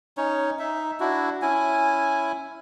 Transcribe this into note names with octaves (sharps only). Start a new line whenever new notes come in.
C#4 D#4 C#5
D#4 E5
D4 E4 F#4
C#4 E4 G#5